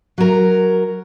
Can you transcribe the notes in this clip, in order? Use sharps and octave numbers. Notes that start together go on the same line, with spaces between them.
F#3 A#4